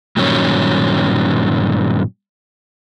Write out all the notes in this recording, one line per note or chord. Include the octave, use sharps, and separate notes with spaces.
G2 A#2 D#3 F#3 C#4